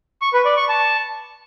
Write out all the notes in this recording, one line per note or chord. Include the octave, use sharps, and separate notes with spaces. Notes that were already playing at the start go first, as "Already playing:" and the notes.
C#6
B4
D5
C#6
A5